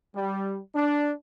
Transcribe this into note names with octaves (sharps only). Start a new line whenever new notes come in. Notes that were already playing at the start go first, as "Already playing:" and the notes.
G3
D4